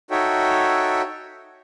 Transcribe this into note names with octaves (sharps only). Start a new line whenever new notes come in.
D#4 F#4 A4 C#5 E5 G5